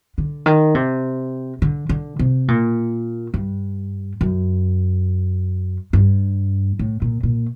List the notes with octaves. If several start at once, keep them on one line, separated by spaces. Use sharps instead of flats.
D3
D#3
C3
D3
D3
C3
A#2
G2
F#2
G2
A2
A#2
A#2